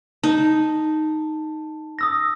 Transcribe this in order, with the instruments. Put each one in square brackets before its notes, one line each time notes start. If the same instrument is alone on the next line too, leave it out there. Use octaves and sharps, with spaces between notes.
[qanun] D#4 [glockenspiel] A5
[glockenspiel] D#6 E6 A#6